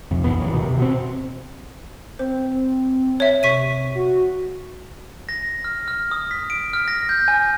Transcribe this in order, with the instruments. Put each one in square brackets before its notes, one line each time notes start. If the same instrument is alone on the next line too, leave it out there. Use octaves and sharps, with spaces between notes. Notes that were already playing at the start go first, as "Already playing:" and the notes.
[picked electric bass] F2 C3
A#1 G#2 E3 B3
D#1 F#2 E3
D2 B2 D#3
C3
B2 C4
[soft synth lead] C4 [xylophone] C5
[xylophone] C#5 E5
[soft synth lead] C3 [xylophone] C#6 B6 D#7
[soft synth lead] F#4
[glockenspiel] A#6
F6
F6
D#6
B6
D7
F6
A#6
G6
G#5